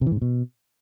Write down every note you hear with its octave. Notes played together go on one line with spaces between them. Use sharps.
C3
E3
G#2
C3
B2